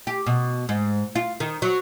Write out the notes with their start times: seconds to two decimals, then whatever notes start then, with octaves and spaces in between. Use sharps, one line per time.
0.07 G4
0.26 B2
0.69 G#2
1.15 F4
1.40 D#3
1.62 F#3